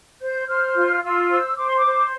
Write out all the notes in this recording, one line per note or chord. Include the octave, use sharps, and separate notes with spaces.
C5 G6
C5 F6
F4
F4 E6
C5 E6
C5 D6
C6
D6
C5